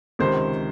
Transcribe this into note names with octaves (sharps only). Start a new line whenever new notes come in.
C#2 C3 D#3 C5